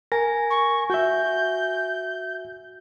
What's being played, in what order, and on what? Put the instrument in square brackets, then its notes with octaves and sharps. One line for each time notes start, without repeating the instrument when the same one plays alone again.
[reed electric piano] A#4 [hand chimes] G#5 A#6
[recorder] C#6
[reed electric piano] F#4 E5 [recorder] G6